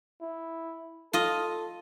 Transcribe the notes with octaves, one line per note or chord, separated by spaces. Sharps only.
E4
F4 A4 D#5